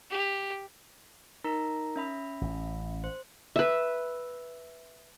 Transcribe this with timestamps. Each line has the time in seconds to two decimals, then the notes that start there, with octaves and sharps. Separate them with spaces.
0.10 G4
1.44 D#4 A#4 A#5
1.96 C#4 E5 B5
2.41 A1
3.04 C5
3.56 B4 E5